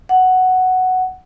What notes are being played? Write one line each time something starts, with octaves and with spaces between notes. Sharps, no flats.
F#5